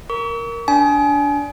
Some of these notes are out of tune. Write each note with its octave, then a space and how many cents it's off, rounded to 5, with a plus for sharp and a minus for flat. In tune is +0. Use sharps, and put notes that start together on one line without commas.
A#4 +0 C#6 +40
D4 -20 G#5 +40